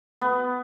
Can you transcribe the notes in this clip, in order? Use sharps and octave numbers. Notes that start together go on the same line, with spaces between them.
B3